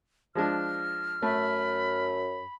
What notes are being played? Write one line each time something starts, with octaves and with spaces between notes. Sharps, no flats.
F3 G#3 D4 F6
F#2 A3 B5